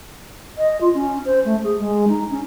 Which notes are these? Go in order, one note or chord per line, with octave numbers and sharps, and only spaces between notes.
D#5
F4
C#4
C5
A3
G#4
G#3
D#4
C#4